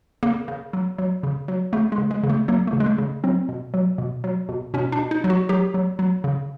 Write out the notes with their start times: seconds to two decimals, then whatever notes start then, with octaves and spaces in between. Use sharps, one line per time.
0.23 C#3 A#3
0.48 C#3
0.73 F#3
0.98 F#3
1.23 C#3
1.48 F#3
1.73 C#3 A3
1.92 G#3
1.98 C#3
2.11 G#3
2.23 C#3
2.30 A3
2.48 F#3 A#3
2.67 A3
2.73 C#3
2.80 G#3
2.86 A3
2.98 C#3
3.24 F#3 C4
3.49 B2
3.74 F#3
3.98 B2
4.24 F#3
4.49 B2
4.74 B2 C#4
4.92 D4
4.99 B2
5.11 D#4
5.24 F#3
5.30 F#4
5.49 F#3 G4
5.74 F#3
5.99 F#3
6.24 C#3